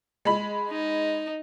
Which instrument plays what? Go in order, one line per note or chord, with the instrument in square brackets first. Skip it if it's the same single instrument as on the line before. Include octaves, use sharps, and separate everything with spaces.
[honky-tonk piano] G#3 B5
[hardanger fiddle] D#4